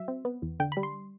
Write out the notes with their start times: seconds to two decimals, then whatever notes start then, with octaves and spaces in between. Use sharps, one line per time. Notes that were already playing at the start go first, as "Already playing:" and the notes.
Already playing: F#3 E5
0.08 C4
0.25 B3
0.42 E2
0.60 D3 G5
0.72 B5
0.77 G3
0.83 C6